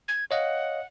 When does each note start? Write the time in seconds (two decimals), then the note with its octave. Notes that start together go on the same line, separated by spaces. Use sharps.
0.08 G#6
0.31 C#5 D#5 F5 F#5